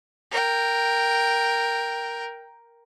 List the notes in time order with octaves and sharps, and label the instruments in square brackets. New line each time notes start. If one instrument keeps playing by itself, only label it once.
[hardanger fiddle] A#4 G5